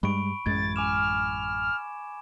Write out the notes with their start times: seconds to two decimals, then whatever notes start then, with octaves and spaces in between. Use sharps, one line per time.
0.03 G2 G3 G#3 B5 C#6 D7
0.46 A1 F#2 G#3 G#6 A6
0.76 G#5 D6 F6 E7